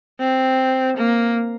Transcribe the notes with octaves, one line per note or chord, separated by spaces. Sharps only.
C4
A#3